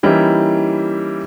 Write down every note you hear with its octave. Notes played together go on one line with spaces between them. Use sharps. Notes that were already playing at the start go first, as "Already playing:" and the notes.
E3 G3 A#3 C#4 D#4 E4